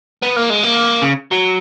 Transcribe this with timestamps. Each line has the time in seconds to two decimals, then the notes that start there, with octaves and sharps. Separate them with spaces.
0.22 B3
0.36 A#3
0.50 G#3
0.64 A#3
1.02 C#3
1.32 F#3